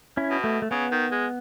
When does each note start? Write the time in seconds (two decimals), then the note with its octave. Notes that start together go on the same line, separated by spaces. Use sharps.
0.17 C#4 E4
0.31 B2
0.44 A3
0.62 A3
0.71 C#3 B3
0.92 D#3
1.12 G#3